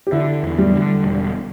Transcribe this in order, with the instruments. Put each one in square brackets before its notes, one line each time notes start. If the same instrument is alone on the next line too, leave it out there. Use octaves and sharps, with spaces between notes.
[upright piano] G4
[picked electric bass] D3 [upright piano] E4
[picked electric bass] E2
[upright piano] G3
[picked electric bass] D3
E1